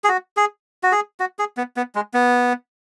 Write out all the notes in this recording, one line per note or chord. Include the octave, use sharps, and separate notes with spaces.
G#4
F#4
G#4
F#4
G#4
F#4
G#4
B3
B3
G#3
B3